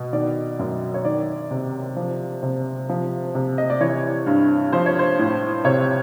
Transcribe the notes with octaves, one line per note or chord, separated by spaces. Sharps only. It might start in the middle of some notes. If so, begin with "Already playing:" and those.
Already playing: B2
D#3 D5
F#2
C#5
D#3 D5
C3
F3
C3
F3
C3
D#5
D5
E3 C#5
G2
F3 C5
C#5
C5
A2
C3 C#5